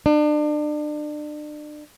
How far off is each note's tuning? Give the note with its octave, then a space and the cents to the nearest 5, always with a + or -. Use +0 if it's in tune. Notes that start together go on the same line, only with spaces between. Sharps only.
D4 +35